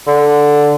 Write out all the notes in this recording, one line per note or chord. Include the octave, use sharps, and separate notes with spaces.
D3